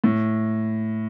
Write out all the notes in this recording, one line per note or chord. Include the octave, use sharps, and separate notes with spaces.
A2